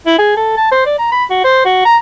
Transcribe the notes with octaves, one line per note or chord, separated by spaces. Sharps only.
E4
G#4
A4
A5
C5
D5
A#5
B5
F#4
C5
F#4
A#5